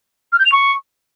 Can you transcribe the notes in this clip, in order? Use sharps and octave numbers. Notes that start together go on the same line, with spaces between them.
F6
G6
F7
C#6